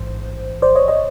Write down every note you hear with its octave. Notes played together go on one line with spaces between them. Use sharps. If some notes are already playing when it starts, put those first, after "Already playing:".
Already playing: A1 G#2 E3 C5
C5 D5
C#5 D#5
C#5 D#5